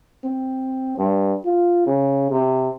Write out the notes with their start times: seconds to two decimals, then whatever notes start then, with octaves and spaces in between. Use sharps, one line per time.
0.24 C4
0.98 G2
1.45 F4
1.86 C#3
2.31 C3